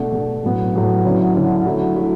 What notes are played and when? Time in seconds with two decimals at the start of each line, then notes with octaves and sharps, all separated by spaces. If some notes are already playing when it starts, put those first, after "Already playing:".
Already playing: B2 A3 D4
0.12 B2 A3 D4
0.43 A2 F#3 B3
0.73 A2 F#3 B3
1.04 D3 F#3 C#4 E4
1.35 D3 F#3 C#4 E4
1.66 F#3 A3 E4
1.96 F#3 A3 E4